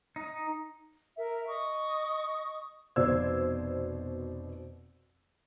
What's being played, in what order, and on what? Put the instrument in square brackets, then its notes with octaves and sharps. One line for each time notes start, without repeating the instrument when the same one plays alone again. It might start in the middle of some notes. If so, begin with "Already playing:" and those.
[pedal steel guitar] D#4
[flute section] A#4 E5
D#5 C#6 D#6
[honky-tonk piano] F1 B2 C5 D5 E6 G#6